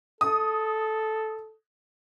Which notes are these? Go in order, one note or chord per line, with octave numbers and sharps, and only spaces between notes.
A4 D#6